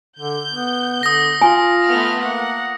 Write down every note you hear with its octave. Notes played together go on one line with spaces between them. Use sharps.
D3 G6
B3
D3 D#6 A#6
F4 G#5
A3 B3 F6
A#3 F#5